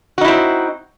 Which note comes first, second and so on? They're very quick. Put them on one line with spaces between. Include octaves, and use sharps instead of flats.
F#4 D#4 E4 C4